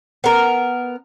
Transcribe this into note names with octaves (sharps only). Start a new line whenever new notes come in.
B3 A#4